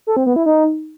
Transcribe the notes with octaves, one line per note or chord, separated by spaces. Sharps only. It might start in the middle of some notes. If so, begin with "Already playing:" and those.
A4
C4
B3
E4
D#4